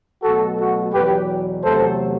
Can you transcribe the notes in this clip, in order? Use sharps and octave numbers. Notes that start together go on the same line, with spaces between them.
B2 F#3 A3 F#4 A4
F#4 A4
E2 B2 F#3 G4 B4
E2 C3 F#3 A3 A4 C5